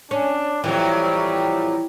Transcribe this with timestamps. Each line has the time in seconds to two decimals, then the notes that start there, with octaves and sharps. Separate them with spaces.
0.11 C#4 D4
0.64 F2 A2 E3 F#3 G3